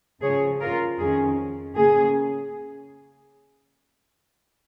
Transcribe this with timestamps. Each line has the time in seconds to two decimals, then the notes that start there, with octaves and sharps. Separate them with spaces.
0.22 C#3 F3 C#4 G#4 C#5
0.60 F4 A#4
0.99 F2 D#3 C#4 G#4
1.76 C#3 A#3 C#4 G#4